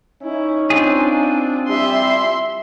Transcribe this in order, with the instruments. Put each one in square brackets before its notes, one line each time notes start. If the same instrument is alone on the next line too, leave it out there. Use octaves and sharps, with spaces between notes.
[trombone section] C#4 D#4 [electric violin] E4
[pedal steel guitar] C4 F4 G#4 [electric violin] D4
[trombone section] G3 E4 G4 [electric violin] E5 C6